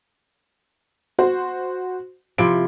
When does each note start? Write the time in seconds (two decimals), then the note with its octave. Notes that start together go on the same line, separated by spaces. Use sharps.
1.19 F#4 C5
2.38 C3 F3 E4 D7